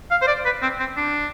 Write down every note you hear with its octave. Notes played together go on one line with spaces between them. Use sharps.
F5
C5
D5
B4
C4
C4
D4